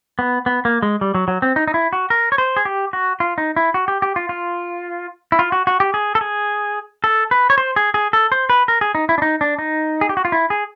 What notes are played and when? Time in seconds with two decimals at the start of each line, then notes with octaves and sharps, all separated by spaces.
0.19 B3
0.46 B3
0.65 A#3
0.82 G#3
1.01 G3
1.15 F#3
1.28 F#3
1.42 C4
1.56 D#4
1.68 D#4
1.74 E4
1.93 F#4
2.10 A#4
2.32 C#5
2.38 C5
2.56 G#4
2.65 G4
2.93 F#4
3.20 F4
3.38 D#4
3.56 E4
3.74 F#4
3.88 G4
4.02 G4
4.16 F4
4.29 F4
5.32 E4
5.39 F4
5.52 F#4
5.67 F#4
5.80 G4
5.94 G#4
6.15 A4
6.21 G#4
7.04 A4
7.31 B4
7.50 C#5
7.58 C5
7.76 G#4
7.94 G#4
8.13 A4
8.32 C5
8.50 B4
8.68 A#4
8.81 G#4
8.95 D#4
9.09 E4
9.18 D4
9.22 D#4
9.41 D4
9.59 D#4
10.01 G#4
10.09 G4
10.17 F#4
10.25 F4
10.32 E4
10.50 G#4